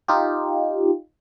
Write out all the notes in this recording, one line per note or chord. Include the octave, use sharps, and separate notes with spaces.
D#4 F4 G4